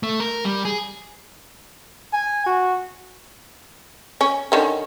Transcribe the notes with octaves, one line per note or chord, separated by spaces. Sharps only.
A3
A#4
G3
G#4
G#5
F#4
C#4
D3 D#3 C#4